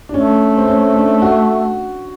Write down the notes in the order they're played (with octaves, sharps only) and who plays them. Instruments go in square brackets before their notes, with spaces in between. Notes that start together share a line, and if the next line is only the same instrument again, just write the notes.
[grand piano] D4
[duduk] A3 [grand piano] C#4
[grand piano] C4
C#4
D4
F#4